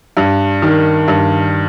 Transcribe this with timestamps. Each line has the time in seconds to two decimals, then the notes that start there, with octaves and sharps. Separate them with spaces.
0.17 G2
0.62 D#3
1.08 G2